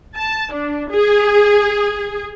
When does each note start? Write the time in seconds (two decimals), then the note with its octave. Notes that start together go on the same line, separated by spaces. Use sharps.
0.17 A5
0.53 D4
0.91 G#4